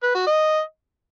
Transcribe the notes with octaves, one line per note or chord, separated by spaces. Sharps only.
B4
F#4
D#5